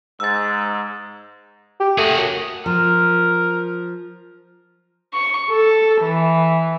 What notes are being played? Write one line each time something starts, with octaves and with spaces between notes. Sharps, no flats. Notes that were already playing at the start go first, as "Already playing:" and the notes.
G#2 E6 A6
G4
A3 F#4 G#4
F#2
F3 A#4
C#6
A4
E3